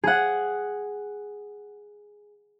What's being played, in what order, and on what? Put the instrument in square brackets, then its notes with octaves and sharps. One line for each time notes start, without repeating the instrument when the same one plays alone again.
[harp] G#4 F#5